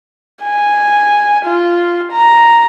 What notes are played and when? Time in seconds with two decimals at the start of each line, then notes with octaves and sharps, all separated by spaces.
0.43 G#5
1.45 F4
2.12 A#5